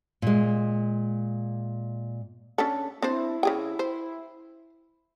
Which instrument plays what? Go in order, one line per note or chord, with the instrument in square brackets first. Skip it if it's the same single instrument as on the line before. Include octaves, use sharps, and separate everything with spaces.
[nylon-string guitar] A#2 G#3
[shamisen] C#4 D4 A4
[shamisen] C4 D4 C5 [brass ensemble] E4
[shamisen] C#3 G#4 G5
C5